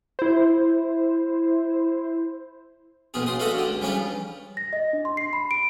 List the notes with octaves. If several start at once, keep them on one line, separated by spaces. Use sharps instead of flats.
E4 C5
A#1 F2 B2 F4 G#4
C#3 C6 D#6
F4 F#4 A4 D#5 E5 F#5
D3 G4
C#2
E3 F3 G3 C#4 D4 F4
A#6
D#5
D4
C6
C7
B5
D7